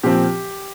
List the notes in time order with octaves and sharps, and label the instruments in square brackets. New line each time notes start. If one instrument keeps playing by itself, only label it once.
[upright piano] A#2 F3 C4 [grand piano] G4